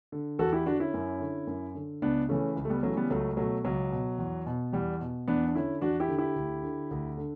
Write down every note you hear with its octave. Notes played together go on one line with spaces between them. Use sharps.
D3
E2 F#4 A4
E4 G4
D3 D4 F#4
C#4 E4
F#2
D3
F#2
D3
C#2 B3 D4
C#3 E3 A3 C#4
C#2
A3
G3 B3
C#3 E3 F#3 A3
G3 B3
C#2 F#3 A3
B2 F#3 A3
C#2 F#3
B2
E2
B2
E2 G3
B2
E2 B3 D4
D4
D3 C#4 E4
E2 D4 F#4
E4 G4
D3
E4 G4
D2
D3
D2
D3